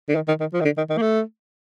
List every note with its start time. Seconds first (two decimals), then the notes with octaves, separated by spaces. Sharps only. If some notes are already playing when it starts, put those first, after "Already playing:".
0.09 D3
0.15 D#3
0.28 D#3
0.40 D#3
0.53 F3
0.61 D#3
0.65 D3
0.77 D#3
0.89 D#3
0.98 A#3
1.02 A3